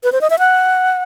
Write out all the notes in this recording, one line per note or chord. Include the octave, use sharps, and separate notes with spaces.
B4
C5
D#5
E5
F#5